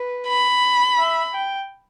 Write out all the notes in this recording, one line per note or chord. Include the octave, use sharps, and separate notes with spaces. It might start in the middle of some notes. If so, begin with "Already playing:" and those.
Already playing: B4
B5
E5
G5